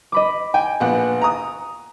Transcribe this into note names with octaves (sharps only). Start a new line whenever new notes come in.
D#5 B5 D6
G5 G#5
A#1 B3 F#5
A#5 D#6